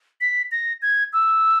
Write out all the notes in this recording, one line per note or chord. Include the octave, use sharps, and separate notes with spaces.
B6
A#6
G#6
E6